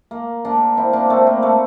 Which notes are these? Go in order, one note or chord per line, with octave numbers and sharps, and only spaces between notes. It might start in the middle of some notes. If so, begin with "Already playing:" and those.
A#3
A#3 D4
C4 E4
A#3 D4
A3 C4
A#3
A3